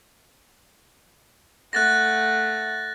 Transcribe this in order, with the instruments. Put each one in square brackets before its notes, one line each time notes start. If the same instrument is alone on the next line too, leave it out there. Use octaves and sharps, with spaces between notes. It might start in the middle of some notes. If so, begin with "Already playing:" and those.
[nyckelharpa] A3 F#5 [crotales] F#6 A6 A#6